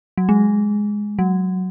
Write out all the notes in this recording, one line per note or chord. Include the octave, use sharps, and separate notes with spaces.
F#3
G#3
F#3